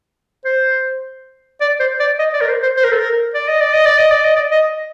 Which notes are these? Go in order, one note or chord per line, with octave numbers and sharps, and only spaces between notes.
C5
D5
C5
D5
D#5
D5
A#4
C5
C5
C5
A#4
A4
A#4
D5
D#5
D5
D#5
D5
D#5
D5
D#5
D5
D#5